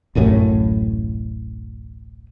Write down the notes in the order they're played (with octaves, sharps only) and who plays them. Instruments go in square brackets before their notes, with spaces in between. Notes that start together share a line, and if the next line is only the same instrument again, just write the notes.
[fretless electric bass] D1 A1 F#2 A2